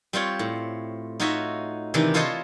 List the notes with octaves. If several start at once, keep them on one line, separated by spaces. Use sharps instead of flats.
G3 C4 F4 C#5
A2
D#4 F4 F#4 C#5 D#5 E5
C3 D#3 E3 D4 D#4 B4
E4 F4 A4 C5 C#5 D#5